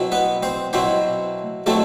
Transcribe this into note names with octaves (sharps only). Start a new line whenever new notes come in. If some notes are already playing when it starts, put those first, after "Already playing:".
Already playing: B2 F#3 C4 E4
B3 B4
C4 C5
B2 F#3 C4 E4 C5
B2 F#3 A3 C4 E4 A4